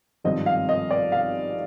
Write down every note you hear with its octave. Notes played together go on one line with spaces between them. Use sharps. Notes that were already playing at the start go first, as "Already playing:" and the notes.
G#1 G2 F3 C4 D#5
F5
D#5
D5
F5